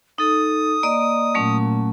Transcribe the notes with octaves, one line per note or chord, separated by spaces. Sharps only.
D#4 A4 D#6
A#3 D5 D#5
A#2 F#3 A3 C#4